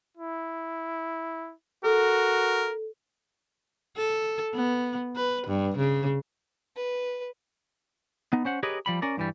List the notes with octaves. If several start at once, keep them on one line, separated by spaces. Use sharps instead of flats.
E4
F#4 A4 A#4
A4
B3
B4
G2
C#3
B4
B3 D#4
C#4 C5 F#5
G4 G#4 A#4 B4 C#5 D#5
F3 G3 B5
C#4 A#4 D5
G2 E3 G3